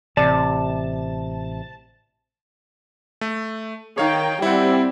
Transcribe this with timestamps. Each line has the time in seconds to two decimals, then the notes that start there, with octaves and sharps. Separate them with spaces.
0.17 A1 C3 D5 A5
3.21 A3
3.98 D#3 C#5 F5 G5
4.42 G3 C4 E4 F#5